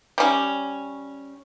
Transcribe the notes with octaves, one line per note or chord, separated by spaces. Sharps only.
G3 C#4